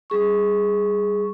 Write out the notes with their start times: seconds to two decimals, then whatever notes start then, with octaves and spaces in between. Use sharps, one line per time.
0.10 G3 G#4 C#6